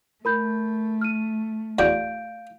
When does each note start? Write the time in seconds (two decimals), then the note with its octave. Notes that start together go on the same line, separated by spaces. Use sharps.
0.25 A3 A#4 B5 G6
1.01 F6 D#7
1.79 E2 F#4 D5 F5 G6 D7